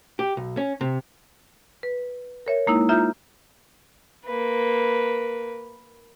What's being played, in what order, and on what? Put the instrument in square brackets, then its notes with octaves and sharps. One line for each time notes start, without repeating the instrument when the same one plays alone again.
[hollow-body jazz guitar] G4
B1
C#4
C3
[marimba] B4
A#4 C#5 E5
G#3 A#3 D#4 E4
D#4 F4 E5 A#5 G6
[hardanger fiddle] A#3 B4